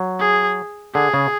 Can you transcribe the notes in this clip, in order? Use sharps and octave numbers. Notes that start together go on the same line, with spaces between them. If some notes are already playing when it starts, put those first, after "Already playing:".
Already playing: F#3
G#4
D3 G#4
C#3